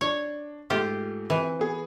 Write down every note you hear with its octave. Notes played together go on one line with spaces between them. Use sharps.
D4 C#5
G#2 A3 F4 G4 C5
E3 C4
B3 G#4